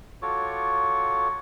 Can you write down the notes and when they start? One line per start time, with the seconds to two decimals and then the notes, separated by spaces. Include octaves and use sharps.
0.22 F4 F#4 A4 C#5 C#6 D6